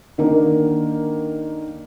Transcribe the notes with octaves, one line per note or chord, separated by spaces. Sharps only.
D3 D#3 A#3